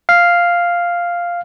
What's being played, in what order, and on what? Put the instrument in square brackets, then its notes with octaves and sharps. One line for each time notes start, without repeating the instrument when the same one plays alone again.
[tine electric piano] F5